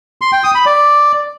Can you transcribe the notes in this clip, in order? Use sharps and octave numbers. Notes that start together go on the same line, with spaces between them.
C6
G5
D#6
B5
D5